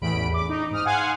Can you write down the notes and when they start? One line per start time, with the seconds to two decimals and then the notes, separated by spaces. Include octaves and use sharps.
0.01 A1 E2 B5 D7
0.34 D6
0.49 D#4
0.71 G#2 D#6 F6
0.85 F5 F#5 G#5 C6 F#6